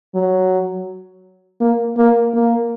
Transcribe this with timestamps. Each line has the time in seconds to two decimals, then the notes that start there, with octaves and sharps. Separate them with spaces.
0.15 F#3
1.61 A#3
1.98 A#3
2.34 A#3